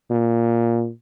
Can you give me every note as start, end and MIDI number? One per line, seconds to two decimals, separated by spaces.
0.11 0.90 46